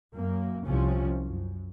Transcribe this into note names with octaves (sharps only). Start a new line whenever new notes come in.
F#2 A#3
C2 C3 F3 C#4
F#2